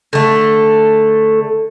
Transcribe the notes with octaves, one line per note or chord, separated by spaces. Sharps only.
D3 A3